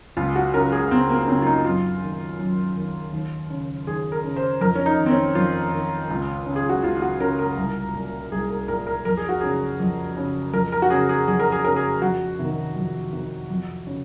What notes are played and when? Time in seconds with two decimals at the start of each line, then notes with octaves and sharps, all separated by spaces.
0.17 C#2 F4
0.36 F#4
0.54 C#3 A#4
0.72 G#4
0.91 C#2 C4
1.10 A#3
1.28 C#3 C4
1.42 F4
1.46 D#4
1.65 F#2 F4
2.02 D#3
2.39 F#2
2.76 D#3
3.13 D#2
3.50 C#3
3.87 D#2 G#4
4.12 A#4
4.24 C#3
4.36 C5
4.61 F2 A#4
4.75 C#4
4.86 D#4
4.98 D#3
5.06 C4
5.10 C#4
5.35 F2 F4
5.73 D#3
6.09 C#2
6.46 C#3
6.56 G#4
6.69 F#4
6.83 C#2 F4
6.97 F4
7.02 F#4
7.20 C#3 A#4
7.39 A#4
7.57 C2
7.94 A#2
8.31 C2 G#4
8.50 A#4
8.68 A#2 A#4
8.87 A#4
9.05 F2 A#4
9.17 G#4
9.29 F#4
9.41 C#3 G#4
9.80 F2
10.17 C#3
10.53 F2 A#4
10.72 A#4
10.82 F#4
10.90 C#3 G#4
11.09 G#4
11.28 F2 G#4
11.40 A#4
11.52 G#4
11.64 C#3 A#4
11.76 G#4
12.02 F2 F#4
12.39 C3 D#3
12.76 F2
13.13 C3 D#3
13.50 F2
13.87 C#3